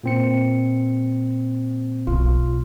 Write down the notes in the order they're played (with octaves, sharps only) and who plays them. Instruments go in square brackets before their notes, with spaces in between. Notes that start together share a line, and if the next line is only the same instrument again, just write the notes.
[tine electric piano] A#2 C4 C#7
[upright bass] B1 B2 [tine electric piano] F4